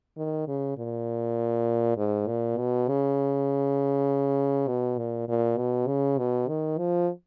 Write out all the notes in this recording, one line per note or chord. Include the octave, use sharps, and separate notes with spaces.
D#3
C#3
A#2
G#2
A#2
B2
C#3
B2
A#2
A#2
B2
C#3
B2
D#3
F3